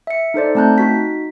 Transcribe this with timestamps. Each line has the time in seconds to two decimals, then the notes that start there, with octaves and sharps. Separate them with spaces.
0.07 E5 C#7
0.34 D#4 A4 C5 D5
0.55 A3 C4 A5 A#5 F#6 G6
0.78 D#4 F#4 B6